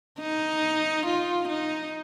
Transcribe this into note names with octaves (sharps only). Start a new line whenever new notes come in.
D#4
F4
D#4